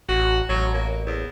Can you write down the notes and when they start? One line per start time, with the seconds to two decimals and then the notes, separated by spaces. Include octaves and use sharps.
0.09 A1 F#4
0.49 A1 F#3
0.74 A#3
1.07 E2